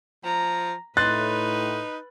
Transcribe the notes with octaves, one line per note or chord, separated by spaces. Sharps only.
F3 A#5
A2 D#4 B4 C6 F#6 A6